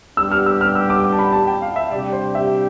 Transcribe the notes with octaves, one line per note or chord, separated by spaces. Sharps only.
G3 B3 D4 G4 E6
F6
E6
F6
E6
D6
D6
A5
B5
A5
G5
F5
E5
C3 G3 D4 G4 D5
C5
E5